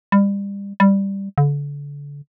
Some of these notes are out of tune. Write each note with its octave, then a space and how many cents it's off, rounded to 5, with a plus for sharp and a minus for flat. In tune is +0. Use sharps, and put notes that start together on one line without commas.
G3 +30
G3 +5
D3 -35